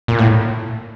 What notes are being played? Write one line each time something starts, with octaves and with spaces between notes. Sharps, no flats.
A#2
A2